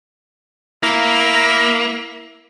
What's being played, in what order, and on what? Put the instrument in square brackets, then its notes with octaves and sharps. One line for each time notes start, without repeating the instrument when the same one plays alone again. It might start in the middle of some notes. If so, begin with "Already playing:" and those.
[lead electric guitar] A#3 [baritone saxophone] E4